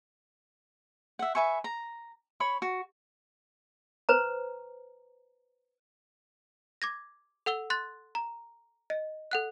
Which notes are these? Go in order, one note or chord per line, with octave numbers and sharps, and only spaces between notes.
E5 F#5
B4 E5 G#5 C#6
A#5
C#5 B5 C#6
F#4
B4 C5 A#5
D6 G#6 A#6
A4 F#5 E6 G7
C6 F#6 A6
A#5
D#5
A4 F#5 F#6